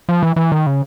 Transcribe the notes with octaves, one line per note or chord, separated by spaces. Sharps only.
F3
E3
E3
D#3
C#3